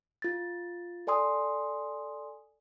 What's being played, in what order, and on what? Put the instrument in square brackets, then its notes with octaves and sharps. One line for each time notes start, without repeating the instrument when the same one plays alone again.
[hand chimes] F4 A6
A4 D5 G#5 C6 D#6